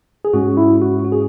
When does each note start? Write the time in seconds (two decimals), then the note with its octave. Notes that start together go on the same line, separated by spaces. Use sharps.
0.25 G#4
0.34 G#2 G#3 C#4 F#4
0.57 E4
0.82 F#4
1.05 F#4
1.12 G#4